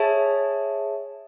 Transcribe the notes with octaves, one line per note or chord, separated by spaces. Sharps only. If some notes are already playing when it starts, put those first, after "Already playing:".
Already playing: G#4 C#5 E5 A5